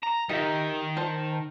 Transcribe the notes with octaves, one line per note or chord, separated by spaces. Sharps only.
A#5
D#3 D#4 G4 E5
C5 A5